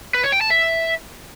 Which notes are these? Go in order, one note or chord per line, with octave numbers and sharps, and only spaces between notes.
B4
C#5
G5
A5
E5